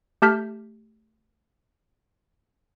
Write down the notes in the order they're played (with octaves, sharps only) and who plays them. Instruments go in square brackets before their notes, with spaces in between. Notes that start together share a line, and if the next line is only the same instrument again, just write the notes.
[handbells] A3 G4 A5 F6 G6 B6